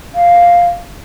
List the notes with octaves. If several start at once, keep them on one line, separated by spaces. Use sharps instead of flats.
F5